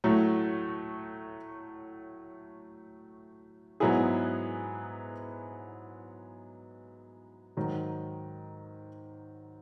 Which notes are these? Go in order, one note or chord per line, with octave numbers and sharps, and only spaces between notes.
A2 F#3 A3
G#2 F#3 B3 E4 G#4
G#2 D#3 F#3